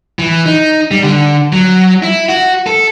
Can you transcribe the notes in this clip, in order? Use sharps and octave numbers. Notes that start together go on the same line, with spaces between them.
E3
D#4
G3
D3
F#3
E4
F#4
A4